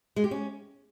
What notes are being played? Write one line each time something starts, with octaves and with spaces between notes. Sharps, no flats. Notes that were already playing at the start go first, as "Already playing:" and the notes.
G#3
G4
C#4